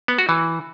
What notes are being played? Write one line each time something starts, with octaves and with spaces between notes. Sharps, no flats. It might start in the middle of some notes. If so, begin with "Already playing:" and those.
B3
F#4
E3